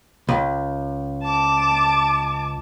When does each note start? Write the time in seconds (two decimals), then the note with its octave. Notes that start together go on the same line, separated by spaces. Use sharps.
0.29 C#2
1.23 A5 D6